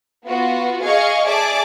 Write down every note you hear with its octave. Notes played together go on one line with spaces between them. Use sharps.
B3 F4 F#4
G#4 D#5 F5 G#5 C#6
G#4 D5 E5 A5 D6